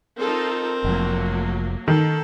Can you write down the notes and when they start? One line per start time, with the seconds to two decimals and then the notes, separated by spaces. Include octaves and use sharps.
0.18 C4 D#4 F4 A4 A#4
0.84 F1 F3 F#3 A3 A#3
1.88 D#3 A4